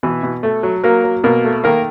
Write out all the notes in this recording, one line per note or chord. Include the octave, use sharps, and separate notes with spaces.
B2 E3 E4
B2
A3 A4
F#3
F#3 A#3 A#4
F#3
B2 A#3 A#4
A3
D#3 A#3 A#4